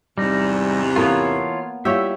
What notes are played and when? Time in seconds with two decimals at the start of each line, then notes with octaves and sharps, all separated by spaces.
0.18 E2 G#2 C3 G3 D#4
0.96 E3 A#3 B3 F4 A4 A#4 C#5
1.85 G3 E4 F4 G4 C#5 E5